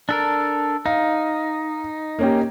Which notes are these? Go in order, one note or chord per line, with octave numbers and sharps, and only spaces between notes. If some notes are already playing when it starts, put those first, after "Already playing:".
D4 A4 A#4
D#4 F5
A#3 C#4 G4